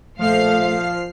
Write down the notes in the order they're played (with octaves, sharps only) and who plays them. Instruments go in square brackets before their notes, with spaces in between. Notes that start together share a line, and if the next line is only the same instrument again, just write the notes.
[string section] A#2 C5 F5 [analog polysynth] F3 F6 C7 [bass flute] A3